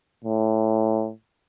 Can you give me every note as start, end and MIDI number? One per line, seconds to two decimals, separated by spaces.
0.24 1.11 45